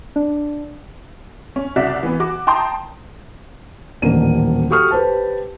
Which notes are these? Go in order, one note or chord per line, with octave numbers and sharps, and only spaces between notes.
D4
C#4
C2 C#3 F#4 D5 E5 B6
E3 B3
F#4 D6
G5 A5 A#5 C6 D#6 G6
D#1 A1 A#3 D4 D#7
F#4 G4 A4 C#6 D#6 F6
G4 B4 C5 A5